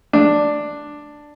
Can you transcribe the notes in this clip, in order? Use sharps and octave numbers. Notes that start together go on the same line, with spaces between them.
D4